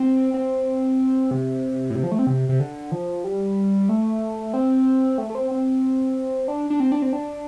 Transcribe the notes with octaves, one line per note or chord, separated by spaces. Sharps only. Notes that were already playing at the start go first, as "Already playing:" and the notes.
Already playing: C4
C4
C3
A2
C3
F3
A3
C4
C3
C3
D3
F3
G3
A3
C4
A3
A3
C4
C4
D4
D4
C4
D4
C4
D4